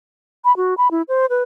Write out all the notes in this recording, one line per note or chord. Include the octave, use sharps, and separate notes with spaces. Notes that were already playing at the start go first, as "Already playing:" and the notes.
B5
F#4
B5
E4
C5
B4